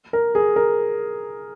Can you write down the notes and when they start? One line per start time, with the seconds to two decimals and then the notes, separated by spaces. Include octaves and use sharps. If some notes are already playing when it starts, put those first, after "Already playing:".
0.13 A#4
0.35 G#4
0.56 A#4